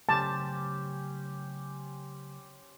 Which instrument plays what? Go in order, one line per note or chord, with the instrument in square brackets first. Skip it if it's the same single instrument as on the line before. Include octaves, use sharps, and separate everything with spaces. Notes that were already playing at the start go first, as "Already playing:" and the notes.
[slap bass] C#3 F#3 A3 [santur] C#4 G4 C5 [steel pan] A5